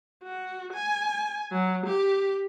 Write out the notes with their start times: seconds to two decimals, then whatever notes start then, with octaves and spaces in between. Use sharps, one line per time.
0.24 F#4
0.73 G#5
1.52 F#3
1.86 G4